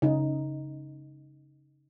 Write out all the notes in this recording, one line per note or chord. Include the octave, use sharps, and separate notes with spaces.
C#3 D#4